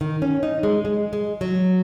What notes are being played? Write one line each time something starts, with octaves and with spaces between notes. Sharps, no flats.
D#3
C#4
D#4
G#3
G#3
G#3
F#3